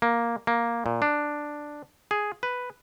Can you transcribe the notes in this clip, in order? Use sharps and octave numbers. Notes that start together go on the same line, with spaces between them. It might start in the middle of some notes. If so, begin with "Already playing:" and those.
A#3
A#3
A#2
D4
G#4
B4